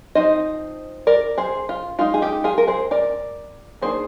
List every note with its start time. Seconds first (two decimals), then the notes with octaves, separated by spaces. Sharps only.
0.15 F3 C4 D#4 C5 D#5
1.07 A#4 D5
1.38 G#4 C5
1.69 F4
1.99 G#3 D#4 F4
2.14 G#4
2.22 D#4 G4
2.44 F4 G#4
2.58 A#4
2.68 G#4 C5
2.91 A#4 D5
3.82 D#3 A#3 D4 G#4 C5